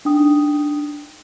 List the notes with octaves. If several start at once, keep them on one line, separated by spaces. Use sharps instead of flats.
D4 D#4 G5 D#6